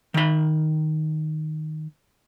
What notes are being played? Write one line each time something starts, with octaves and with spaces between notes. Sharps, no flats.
D#3 B5